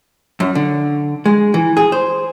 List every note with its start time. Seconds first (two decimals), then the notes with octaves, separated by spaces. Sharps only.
0.40 F#2
0.55 D3
1.26 G#3
1.54 E3
1.77 G#4
1.92 C5